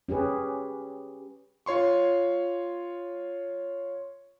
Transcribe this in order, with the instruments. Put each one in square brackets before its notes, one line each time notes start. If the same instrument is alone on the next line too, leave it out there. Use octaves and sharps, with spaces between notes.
[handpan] C#4 G4 G#4 B4
[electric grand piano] F4 C#5 C6 C#6